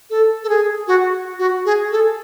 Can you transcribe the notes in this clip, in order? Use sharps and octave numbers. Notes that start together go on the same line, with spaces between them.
A4
A4
G#4
F#4
F#4
G#4
A4